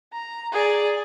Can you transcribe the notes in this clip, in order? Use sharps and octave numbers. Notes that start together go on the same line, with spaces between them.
A#5
G#4 D5